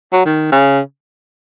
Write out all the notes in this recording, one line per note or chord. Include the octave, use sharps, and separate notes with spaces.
F#3
D#3
C#3